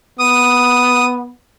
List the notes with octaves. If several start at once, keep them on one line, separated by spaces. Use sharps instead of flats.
B3 D#6